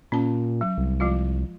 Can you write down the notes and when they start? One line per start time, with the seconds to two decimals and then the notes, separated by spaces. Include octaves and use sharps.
0.12 A#2 C#4 A5
0.61 F#3
0.78 C2
1.00 F3 G#3 F4